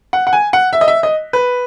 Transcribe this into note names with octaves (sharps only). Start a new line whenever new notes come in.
F#5
F#5
G#5
F#5
E5
D#5
E5
D#5
B4